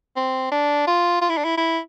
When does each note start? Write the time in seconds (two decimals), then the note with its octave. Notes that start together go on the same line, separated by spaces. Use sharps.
0.16 C4
0.52 D4
0.87 F4
1.22 F4
1.29 E4
1.37 D4
1.45 E4
1.58 E4